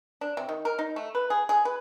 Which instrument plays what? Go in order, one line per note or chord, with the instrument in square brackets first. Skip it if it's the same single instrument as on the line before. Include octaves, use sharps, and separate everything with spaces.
[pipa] D4
C3
D#3
A#4
D#4
A3
B4
G#4
G#4
B4